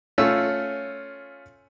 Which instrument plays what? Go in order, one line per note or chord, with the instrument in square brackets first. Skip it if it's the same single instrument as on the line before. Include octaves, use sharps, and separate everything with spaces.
[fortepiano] A3 C#4 F4 E6